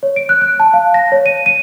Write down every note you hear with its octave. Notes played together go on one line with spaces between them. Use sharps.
C#5
D7
F#6
F#6
A5
F5
A#6
C#5
D#7
D#7